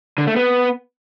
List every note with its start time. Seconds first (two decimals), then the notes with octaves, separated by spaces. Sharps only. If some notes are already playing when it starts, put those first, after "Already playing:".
0.18 D3
0.27 A3
0.36 B3